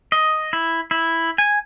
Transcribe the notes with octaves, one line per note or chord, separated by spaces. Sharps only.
D#5
E4
E4
G#5